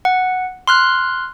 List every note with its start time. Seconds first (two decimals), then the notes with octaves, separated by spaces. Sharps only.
0.05 F#5
0.67 C6 F6 F#6